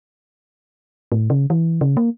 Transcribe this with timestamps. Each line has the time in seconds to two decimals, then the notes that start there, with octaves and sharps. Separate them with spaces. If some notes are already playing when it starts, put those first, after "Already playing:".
1.12 A2
1.30 C#3
1.50 E3
1.81 C#3
1.97 A#3